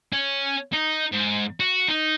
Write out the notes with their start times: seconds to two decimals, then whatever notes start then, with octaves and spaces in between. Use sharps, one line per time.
0.13 C#4
0.73 D#4
1.12 G#2
1.60 F#4
1.88 D#4